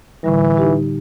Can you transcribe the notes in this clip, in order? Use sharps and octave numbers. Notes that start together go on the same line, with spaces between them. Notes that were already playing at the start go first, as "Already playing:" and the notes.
A2 D3 E3 G3
D#4 G4